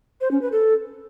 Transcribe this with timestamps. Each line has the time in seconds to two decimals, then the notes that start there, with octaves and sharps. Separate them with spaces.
0.21 C5
0.31 C#4
0.42 B4
0.52 A4